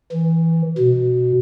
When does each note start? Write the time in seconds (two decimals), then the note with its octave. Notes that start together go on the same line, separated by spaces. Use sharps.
0.12 E3
0.78 B2